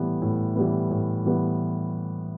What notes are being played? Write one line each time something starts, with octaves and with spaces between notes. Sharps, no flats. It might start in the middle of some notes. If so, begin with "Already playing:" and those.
Already playing: A2 E3 G3 B3
A2
E3 G3 B3
A2
E3 G3 B3